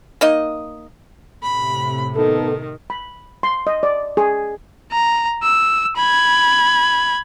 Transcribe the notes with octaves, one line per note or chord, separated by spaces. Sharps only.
A#3 D#4 D#5
A2 C3 B5
D#3 B3 D#4 A4
B5
C6
D#5
D5
G#4
A#5
E6
B5 G#6